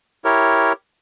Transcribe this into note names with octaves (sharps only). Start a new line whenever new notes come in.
E4 G4 A#4 C#5